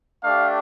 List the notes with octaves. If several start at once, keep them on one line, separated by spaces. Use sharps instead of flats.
A3 D4 G4 F5